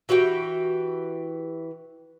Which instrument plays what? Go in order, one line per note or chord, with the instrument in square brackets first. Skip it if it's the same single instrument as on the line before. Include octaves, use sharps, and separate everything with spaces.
[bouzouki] E3 F#4 G4 G5